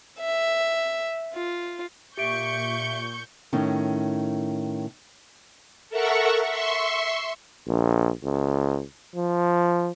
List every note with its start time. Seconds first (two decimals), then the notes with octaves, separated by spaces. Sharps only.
0.19 E5
1.34 F4
2.17 A#2 G4 E5 C#6 G6 C#7 D7
3.53 A2 D#3 C#4
5.89 A4 A#4 E5 F#5 C#6
6.47 E5 C6 C#6
7.67 A#1
8.23 C#2
9.15 F3